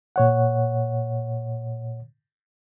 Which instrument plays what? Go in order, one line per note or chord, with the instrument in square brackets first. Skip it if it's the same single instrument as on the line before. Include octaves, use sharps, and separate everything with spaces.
[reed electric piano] A#2 C#5 F#5